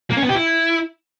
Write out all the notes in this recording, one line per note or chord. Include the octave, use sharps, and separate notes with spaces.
A#3
C#4
B3
G4
E4